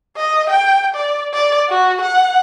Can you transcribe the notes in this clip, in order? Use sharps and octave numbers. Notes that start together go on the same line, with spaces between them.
D#5
G5
D5
D5
F#4
F#5